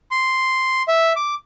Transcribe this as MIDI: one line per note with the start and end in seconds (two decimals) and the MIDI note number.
0.11 0.83 84
0.88 1.13 76
1.16 1.35 86